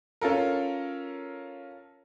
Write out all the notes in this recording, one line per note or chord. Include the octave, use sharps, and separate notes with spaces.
C#4 F4 A4 A#4